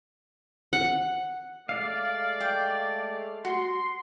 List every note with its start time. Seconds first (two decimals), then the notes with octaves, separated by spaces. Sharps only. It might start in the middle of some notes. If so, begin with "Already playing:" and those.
0.73 F#5
1.69 G#3 A3 D5 F5
2.40 G5
3.45 F#4 C6